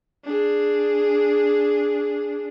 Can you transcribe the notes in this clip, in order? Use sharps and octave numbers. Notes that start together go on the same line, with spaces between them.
D4 G#4